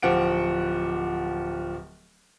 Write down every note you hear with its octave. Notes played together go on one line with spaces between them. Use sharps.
D1 F3 G4 F#5 D7